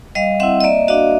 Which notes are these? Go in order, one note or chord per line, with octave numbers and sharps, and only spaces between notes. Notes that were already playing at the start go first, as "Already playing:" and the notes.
G3 D#5 F5
C4 E4 E5 F#5
D#5
A#3 D5 E5
D4 F#4 D#5 F5